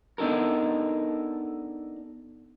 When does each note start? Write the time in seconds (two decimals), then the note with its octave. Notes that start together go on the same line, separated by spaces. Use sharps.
0.18 B3 D4 D#4 A4 A#4